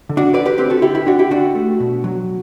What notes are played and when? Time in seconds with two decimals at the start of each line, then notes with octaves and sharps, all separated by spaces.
0.09 D3
0.17 D4 F#4
0.33 D3 B4 D5
0.45 G4 B4
0.58 C4 G4 B4
0.70 F#4 A4
0.82 D3 E4 G4
0.95 E4
1.06 D3 D4 F#4
1.19 E4 G4
1.30 D3 D4 F#4
1.55 A3
1.80 B2
2.04 F#3